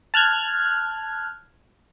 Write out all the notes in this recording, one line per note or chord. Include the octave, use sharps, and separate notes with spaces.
A5 F6 F#6 G#6